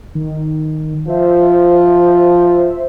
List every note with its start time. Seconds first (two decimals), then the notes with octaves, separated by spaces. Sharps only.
0.15 D#3
1.08 F3 C5 E5